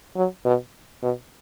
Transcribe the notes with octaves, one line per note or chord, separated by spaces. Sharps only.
F#3
B2
B2